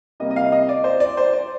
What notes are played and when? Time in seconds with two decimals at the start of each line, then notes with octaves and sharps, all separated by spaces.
0.20 C3 G3 A#3 D#5
0.31 D#5
0.36 F5
0.52 D#5
0.69 D5
0.84 C5
1.00 D5
1.17 C5
1.33 D5